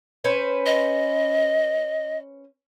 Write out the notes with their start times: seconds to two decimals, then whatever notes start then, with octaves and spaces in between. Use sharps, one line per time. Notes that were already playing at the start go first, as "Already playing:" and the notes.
0.24 C#4 B4 C5
0.66 D#5